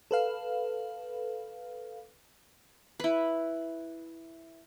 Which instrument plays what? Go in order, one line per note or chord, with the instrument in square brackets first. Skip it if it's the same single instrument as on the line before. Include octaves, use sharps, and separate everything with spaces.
[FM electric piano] A4 B4 F5
[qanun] E4 B4